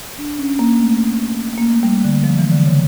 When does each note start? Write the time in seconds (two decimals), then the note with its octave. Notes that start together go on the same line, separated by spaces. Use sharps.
0.19 D4
0.38 C#4
0.59 A#3
0.80 A3
1.58 A#3
1.71 A3
1.83 G3
2.04 D3
2.24 F3
2.38 E3
2.51 D3
2.66 C#3